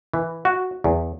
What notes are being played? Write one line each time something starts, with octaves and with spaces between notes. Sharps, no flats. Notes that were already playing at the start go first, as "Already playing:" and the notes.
E3
F#4
E2